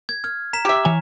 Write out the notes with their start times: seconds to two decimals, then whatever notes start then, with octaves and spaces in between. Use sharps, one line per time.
0.09 G#6
0.24 F6 G#6
0.53 A#5 B6 E7
0.65 G4 E5
0.85 E3 C#5 G#5